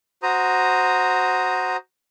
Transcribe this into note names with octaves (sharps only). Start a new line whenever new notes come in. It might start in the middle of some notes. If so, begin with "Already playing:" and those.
F#4 C5 A#5 D#6